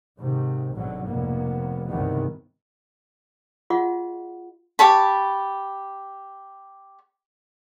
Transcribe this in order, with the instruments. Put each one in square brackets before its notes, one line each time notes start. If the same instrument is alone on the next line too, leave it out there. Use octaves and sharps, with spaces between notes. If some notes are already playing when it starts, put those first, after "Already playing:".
[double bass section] G#2 C3 D#3
G#1 G#2 B2 D3 F#3
F1 A#3 B3
C#2 G2 C3 D#3 E3 B3
[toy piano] F4 F#4 G#4 D#5 F5 F#5
[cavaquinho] G4 C#5 A5 B5